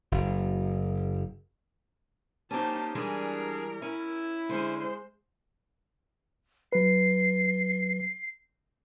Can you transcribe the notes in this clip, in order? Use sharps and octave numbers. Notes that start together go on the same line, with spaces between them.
F#1 F#2
A#3 C4 C#4 D#4 G4 A5
E3 G3 G#3 D4 G#4 A#4
C#4 E4
D3 G#3 C#4 C5
F#3 B4 C7